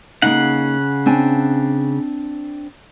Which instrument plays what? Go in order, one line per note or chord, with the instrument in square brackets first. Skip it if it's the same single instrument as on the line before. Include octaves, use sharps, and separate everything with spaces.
[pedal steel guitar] C#3 F#5 [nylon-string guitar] A#3 D#4
[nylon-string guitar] C4 D4 G#5